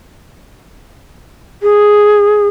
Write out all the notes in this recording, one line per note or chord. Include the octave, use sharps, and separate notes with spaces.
G#4